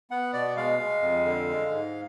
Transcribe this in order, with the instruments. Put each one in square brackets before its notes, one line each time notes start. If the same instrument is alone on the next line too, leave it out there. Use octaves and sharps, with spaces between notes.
[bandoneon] B3 F#5
B2 D5
G#3 F5
G#3
F2
D3
G#3
G#2